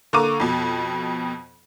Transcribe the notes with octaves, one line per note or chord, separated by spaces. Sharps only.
D3 A#3 A#5 C#6 D6 D#7
F2 B2